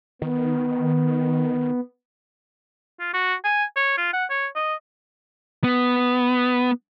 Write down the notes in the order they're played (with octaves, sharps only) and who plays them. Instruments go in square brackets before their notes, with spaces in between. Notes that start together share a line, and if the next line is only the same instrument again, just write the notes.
[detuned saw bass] D#3 [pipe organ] B3
[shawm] F4
F#4
G#5
C#5
F4
F#5
C#5
D#5
[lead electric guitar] B3